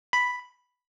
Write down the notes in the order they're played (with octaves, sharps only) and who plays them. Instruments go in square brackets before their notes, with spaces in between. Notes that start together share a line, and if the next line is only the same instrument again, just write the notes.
[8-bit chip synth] B5